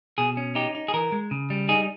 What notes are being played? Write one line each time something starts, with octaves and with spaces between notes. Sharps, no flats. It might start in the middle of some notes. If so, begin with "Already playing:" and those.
B2 G#4
C#4
D#4 G4
D#4
G#4
E3 A#4
G#3
C#3
G3
D#4 G#4